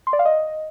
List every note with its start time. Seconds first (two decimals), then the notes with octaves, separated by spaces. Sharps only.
0.07 C6
0.13 D5
0.19 F5
0.25 D#5